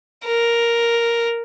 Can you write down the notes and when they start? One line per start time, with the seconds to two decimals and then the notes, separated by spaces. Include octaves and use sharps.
0.25 A#4